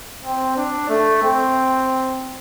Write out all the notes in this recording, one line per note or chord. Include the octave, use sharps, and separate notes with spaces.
C4
D4
A3
C4